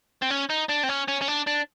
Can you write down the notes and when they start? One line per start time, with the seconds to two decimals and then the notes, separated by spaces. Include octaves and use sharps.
0.22 C4
0.31 C#4
0.50 D#4
0.69 D4
0.83 C4
0.89 C#4
1.08 C#4
1.21 C#4
1.28 D4
1.47 D4